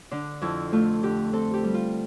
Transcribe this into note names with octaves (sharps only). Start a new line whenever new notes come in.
D3 D4
F2 E4
A3 F4
D3 G4
C4 A4
G4
G3
F4